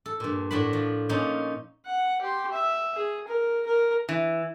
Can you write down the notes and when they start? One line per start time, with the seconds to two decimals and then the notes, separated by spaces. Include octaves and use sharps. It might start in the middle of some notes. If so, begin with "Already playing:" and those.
0.06 A4
0.20 G2 A#2
0.51 A2 D4 F#4 A5 B5
0.73 F3
1.09 A#2 F3 C#4 D#4
1.86 F#5
2.21 G4 C6
2.52 E5
2.96 G#4
3.27 A#4
3.66 A#4
4.09 E3